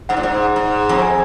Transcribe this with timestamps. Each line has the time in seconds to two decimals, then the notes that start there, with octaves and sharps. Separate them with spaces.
0.09 G#2 F#5
0.17 A#2
0.23 G#2
0.56 G#2
0.89 F2
1.02 G#5